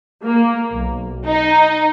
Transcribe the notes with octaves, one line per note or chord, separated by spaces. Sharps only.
A#3
B1
D#4